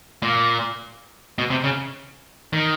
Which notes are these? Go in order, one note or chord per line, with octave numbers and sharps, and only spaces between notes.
A#2
B2
C3
C#3
D#3